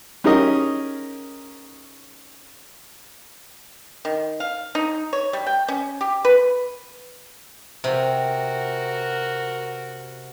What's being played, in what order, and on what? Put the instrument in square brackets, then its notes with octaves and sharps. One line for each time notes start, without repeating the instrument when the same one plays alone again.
[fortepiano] C#4 D#4 G4 G#4 A#4 D#5
[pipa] D#3
F5
D#4
C#5
G3
G5
C#4
G4
B4
[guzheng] C3 [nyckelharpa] F#4 A#4